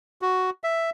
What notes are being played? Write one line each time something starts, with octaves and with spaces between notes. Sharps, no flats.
F#4
E5